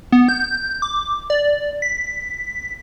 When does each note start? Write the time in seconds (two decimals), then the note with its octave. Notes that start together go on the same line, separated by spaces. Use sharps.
0.12 B3
0.29 G6
0.82 D6
1.30 D5
1.82 B6